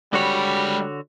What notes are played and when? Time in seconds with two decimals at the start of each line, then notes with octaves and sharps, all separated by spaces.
0.13 D3 G3 G#3 F#4 C#5 B5